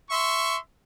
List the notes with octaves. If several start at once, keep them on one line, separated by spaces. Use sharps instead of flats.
E5 C6 C#6